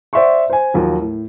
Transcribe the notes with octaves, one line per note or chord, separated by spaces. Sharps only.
C5 D5 E5 F#5 C6 C#6
C5 G#5
D#2 F3 F#3
A2